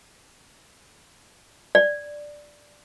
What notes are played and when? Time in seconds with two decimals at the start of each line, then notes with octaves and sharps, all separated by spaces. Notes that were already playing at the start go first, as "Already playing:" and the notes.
1.75 D5